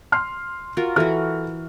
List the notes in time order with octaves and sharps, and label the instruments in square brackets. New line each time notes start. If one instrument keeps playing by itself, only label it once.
[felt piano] C6 F6 C7
[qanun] F4 F#4 A#4
[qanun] E3 F#4 [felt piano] A4 F6